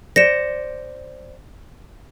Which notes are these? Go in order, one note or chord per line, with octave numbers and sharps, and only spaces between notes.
C5 D5 A#6 C#7 E7